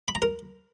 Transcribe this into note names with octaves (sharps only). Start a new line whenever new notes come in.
B5
A#5
A#4